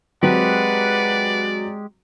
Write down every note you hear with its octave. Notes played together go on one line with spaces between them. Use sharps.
F#3 G#3 C4 G4 B4 D5 F#5